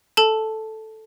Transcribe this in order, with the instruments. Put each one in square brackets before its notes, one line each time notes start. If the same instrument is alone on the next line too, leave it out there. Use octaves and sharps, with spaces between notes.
[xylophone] A4 A5